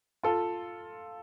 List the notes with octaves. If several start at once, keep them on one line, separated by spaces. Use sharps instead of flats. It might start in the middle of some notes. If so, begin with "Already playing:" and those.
F4 A4